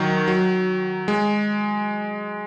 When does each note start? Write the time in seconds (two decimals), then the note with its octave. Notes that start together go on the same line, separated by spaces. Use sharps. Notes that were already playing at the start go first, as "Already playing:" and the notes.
Already playing: D#3 F#3
0.28 F#3
1.08 G#3